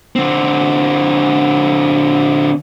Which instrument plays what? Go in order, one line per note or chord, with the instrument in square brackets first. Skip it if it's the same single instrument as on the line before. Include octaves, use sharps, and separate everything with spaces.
[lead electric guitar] D3 C4